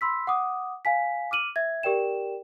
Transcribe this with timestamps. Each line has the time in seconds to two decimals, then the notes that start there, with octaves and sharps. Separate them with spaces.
0.01 B5 C6 E6 B6
0.27 F#5 D6 D#6
0.85 F5 G#5 B6
1.31 D6 F6 D#7 F#7
1.56 E5 G#6
1.83 G4 A#4 D5 G5 E7